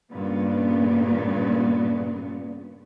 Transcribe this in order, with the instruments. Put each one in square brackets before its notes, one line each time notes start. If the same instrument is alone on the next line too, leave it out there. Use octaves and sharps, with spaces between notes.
[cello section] G2 A#2 C#3 B3